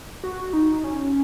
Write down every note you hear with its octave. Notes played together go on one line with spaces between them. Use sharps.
F#4
D#4
C#4